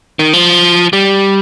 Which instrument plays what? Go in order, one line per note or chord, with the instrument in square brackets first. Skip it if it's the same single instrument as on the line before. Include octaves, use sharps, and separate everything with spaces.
[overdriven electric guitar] D#3
F3
G3